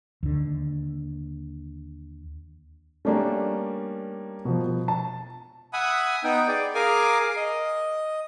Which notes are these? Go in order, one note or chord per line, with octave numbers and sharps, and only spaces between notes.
D#2 D3
G3 A3 A#3 C#4 D4
B2 F3
A5
E5 F#5 G#5 B5 D#6
B3 D#4 G5
G#4 D5
G#4 A#4 F5 G#5 D6
D#5